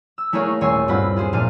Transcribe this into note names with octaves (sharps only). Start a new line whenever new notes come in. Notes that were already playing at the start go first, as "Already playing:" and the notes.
E6
A3 E4 G#4 A#4 C#5 F5
D#1 C#5 G#5 C6 E6
G2 C4 F4 F#5 B5
F4 G#4 C5
F1 A#2 F5 F6 D#7